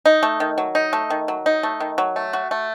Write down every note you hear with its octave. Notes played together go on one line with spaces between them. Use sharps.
D#4
A3
D#3
F#3
D#4
A3
D#3
F#3
D#4
A3
D#3
F#3
A3
F#4
A3